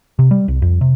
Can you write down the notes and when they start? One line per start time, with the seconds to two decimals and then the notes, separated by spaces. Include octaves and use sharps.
0.19 C3
0.31 G3
0.48 C2
0.62 F2
0.81 C3